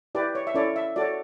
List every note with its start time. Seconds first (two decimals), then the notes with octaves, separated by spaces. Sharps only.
0.15 E4 G4 B4 D5
0.35 C#5
0.47 E5
0.54 C#4 E4 A4 C#5 D5
0.76 E5
0.96 F#4 A4 C#5 D5